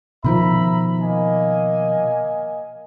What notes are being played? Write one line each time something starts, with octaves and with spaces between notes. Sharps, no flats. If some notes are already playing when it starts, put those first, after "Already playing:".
B2 D#3 F3 E5 A#5 B5
A#3 D#5 G#5